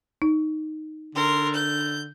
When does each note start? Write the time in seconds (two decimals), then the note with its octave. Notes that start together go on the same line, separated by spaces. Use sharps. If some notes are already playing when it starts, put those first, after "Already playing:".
0.22 D#4
1.15 D3 A#4 C6
1.54 G6